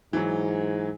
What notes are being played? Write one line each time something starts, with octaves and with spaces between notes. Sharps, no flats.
G#2 E3 F#3